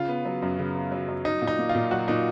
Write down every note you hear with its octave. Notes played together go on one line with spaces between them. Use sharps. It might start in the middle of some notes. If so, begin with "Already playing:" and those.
Already playing: C#3 F4
B3
F#3
F#2
C#3
B3
F#3
F#2
F#3 D#4
A#2
D#4
A#3
F4
A#2
F#3 F#4
A#2 D#4